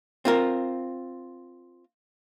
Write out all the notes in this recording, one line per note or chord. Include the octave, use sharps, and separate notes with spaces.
C4 F4 A#4